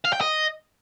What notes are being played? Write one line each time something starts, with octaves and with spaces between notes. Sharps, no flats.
F5
G5
D#5